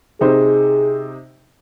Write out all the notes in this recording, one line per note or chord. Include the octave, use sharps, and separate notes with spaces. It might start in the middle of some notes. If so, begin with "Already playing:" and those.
C3 D#4 G#4 C5